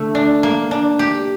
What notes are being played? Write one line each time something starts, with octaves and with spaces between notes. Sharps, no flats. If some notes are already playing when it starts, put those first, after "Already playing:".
Already playing: D3 A3
D4
A#3
D4
G4